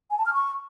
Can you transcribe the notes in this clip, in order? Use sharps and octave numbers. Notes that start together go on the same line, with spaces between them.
G#5
A5
F6
C#6